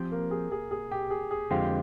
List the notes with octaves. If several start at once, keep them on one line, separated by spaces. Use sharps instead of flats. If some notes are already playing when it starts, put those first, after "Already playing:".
Already playing: F3 C4 G4
A#3
G#4
G#4
G#4
G4
G#4
G#4
F2 D3 G#3 C4 F4 G4